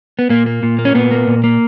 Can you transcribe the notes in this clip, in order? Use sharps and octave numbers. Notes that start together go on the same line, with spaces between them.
B3
A#2 A#3
A#3
A#2
A#3
C#4
A#2 B3
A#3
A#2
A#3